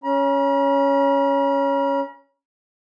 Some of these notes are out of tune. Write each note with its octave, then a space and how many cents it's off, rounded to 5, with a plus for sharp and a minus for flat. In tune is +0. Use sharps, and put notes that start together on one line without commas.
C#4 +5 A#5 +45